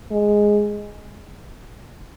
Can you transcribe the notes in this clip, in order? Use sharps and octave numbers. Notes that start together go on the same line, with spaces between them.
G#3